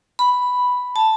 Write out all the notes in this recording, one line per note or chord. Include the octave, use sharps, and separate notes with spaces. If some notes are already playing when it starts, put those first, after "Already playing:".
B5
A5